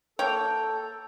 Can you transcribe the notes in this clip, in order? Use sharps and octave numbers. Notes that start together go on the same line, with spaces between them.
A#3 A4 C#5 G5